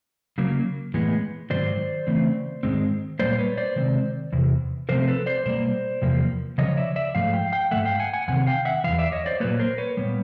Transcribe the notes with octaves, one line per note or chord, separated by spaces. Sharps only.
C#3 F#3 A#3
A2 E3 G#3 B3
G#2 D#3 F#3 C5 D5
C#3 E3 A3 C4
G#2 D#3 G#3 C4
A#2 G3 A#3 C5 D5
B4 C#5
C5 D5
C3 D#3 G#3 C4
E2 C3
C3 F3 A3 C4 A#4 C5
A4 B4
C5 D5
B2 G3 A#3 C5 D5
E2 C3 F3 A#3
C#3 F3 C#5 D#5
D5 E5
D5 E5
G#2 F3 A3 F5
F5 G5
F5 G5
G#2 F3 A3 E5 F#5
F5 G5
F#5 G#5
F#5 G#5
E2 C3 D#3 F#5 G#5
F5 G5
E5 F#5
E2 C#3 E3 F5
D5 E5
C#5 D#5
C5 D5
A#2 F#3 A#3 B4 C#5
A#4 C5
B4 C#5
A#2 G3 B3